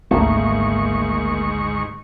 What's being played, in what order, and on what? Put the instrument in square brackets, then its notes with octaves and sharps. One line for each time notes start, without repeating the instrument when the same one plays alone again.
[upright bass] G#1 D2 [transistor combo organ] G#2 C#6 [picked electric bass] A3 A#3